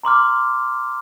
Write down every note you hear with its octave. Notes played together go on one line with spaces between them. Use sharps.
A#5 C6 D6 F6